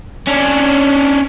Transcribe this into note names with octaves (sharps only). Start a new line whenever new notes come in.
C#4 D4